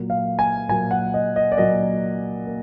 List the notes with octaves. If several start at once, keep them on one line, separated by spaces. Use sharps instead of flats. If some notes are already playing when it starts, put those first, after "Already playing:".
Already playing: A#2 F#3 A#3
F5
G#5
A#2 F#3 A#3 G#5
F#5
D#5
D#5
D5
A#2 F#3 A#3 D#5
A#3